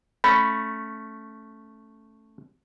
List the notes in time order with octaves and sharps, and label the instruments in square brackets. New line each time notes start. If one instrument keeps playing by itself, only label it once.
[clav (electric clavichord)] A3 C#4 [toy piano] B5